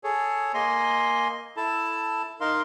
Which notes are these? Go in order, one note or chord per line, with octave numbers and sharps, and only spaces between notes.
G#4 A4 C#5
A#3 D#5 G#5 C6
E4 A4 A5
D#4 A#4 F5 C6